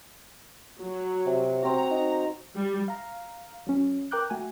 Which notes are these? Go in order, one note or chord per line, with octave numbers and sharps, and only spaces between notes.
F#3
C3
C4 F#4 A#5
D#4
G3
F5 A#5
F#3 C#4
A#4 G5 A#5 D6 F#6 G6
A3 F#4 F#5 G#5